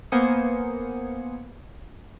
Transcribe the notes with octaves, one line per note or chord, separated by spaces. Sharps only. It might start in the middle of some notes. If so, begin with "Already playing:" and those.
A#3 B3 C5 G#5 D#6 C#7